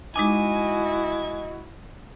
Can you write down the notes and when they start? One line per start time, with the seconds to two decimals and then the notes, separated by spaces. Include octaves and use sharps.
0.16 G#3 D#4 E4 F#4 D#5 G#5 D6